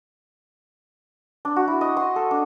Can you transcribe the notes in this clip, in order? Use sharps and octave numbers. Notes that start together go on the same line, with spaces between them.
D4
F#4
E4
D#5
C6
A4
D4